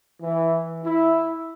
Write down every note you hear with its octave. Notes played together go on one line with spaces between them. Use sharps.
E3
E4